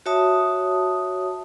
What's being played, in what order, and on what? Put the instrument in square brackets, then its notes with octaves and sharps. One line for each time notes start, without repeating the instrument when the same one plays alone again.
[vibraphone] F#4 C#5 E5 A5 D#6